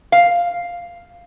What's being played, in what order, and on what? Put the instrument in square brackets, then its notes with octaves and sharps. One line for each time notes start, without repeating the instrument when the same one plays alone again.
[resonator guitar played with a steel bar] F5